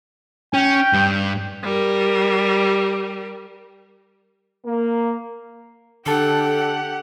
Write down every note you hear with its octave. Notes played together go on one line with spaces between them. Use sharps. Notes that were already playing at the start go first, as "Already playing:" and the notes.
C#4 G5
G2
G3 A#4
A#3
D3 D4 G4 A4 F#5 A5